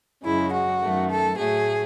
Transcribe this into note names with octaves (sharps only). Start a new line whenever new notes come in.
F#2 C#3 G#3 E4
F#4
F#2 D#3 A3
A4
A2 F#3 A3 G#4